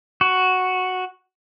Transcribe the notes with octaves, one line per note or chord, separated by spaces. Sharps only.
F#4